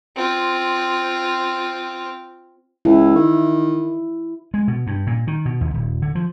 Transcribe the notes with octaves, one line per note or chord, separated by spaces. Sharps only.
C4 F4
C#2 E4
D#3
G#3
B2
G2
A#2
D#3
B2
D#2
D#1
D3
F3